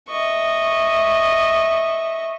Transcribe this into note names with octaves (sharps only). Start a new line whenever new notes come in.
D#5 E5 C#6